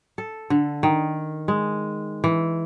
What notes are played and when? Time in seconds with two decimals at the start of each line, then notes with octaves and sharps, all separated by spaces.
0.18 A4
0.50 D3
0.83 D#3
1.48 G#3
2.24 E3